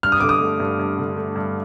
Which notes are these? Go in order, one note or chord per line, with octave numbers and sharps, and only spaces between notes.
G2 F6
D#6
D3 D6
D#6
A3
G2
G2
D3
A3
G2